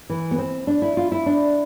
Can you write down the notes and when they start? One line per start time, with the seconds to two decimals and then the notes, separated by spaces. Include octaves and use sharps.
0.10 E3
0.31 B3
0.38 C4
0.67 D4
0.82 E4
0.97 F4
1.12 E4
1.26 D4